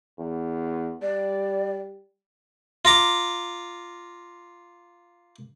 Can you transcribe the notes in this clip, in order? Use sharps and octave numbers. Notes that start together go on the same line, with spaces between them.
E2
G3 D5
F4 A#5 D6